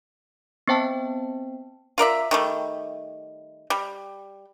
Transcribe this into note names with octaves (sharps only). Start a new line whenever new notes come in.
B3 C4 C5 G5 A5
F4 A#4 D5 E5
D#3 G3 A3
G3